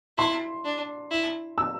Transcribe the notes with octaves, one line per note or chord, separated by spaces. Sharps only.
E4 C6
D4
E4
E6